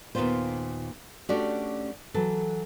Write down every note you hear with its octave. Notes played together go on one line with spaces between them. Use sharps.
D#2 A#2 A#3 B3 F4 C5
A3 C#4 D4 F#4 G4 D5
E3 F#3 A4